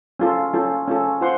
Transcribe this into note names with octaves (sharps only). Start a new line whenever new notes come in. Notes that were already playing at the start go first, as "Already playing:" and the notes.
C#4 F4 A4
C#4 F4 A4
C#4 F4 A4
F4 C5 F#5 C6